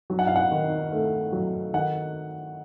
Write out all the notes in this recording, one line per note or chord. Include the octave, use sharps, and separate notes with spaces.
F#3
F#5
F5
F#5
D#3
A3
F#3
D#3 F#5